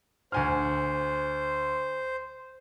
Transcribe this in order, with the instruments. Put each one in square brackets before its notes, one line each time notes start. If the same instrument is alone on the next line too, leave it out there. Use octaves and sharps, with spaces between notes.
[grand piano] D2 G#5 F6 [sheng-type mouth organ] C5